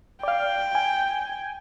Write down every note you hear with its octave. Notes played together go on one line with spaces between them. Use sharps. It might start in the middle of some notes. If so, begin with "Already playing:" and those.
D5 F5 G5
G#5